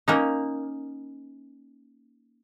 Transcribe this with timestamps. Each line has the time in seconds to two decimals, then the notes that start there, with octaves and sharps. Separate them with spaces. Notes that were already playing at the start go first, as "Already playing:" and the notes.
0.08 A#3 C#4 D#4